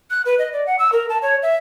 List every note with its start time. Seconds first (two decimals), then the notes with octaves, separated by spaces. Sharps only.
0.10 F#6
0.25 B4
0.39 D#5
0.53 D5
0.66 F#5
0.79 E6
0.92 A#4
1.09 A5
1.22 C#5
1.42 E5